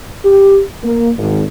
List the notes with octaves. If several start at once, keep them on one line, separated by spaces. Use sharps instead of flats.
G4
A#3
G#1